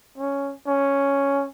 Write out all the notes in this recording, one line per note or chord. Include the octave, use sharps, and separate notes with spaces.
C#4
C#4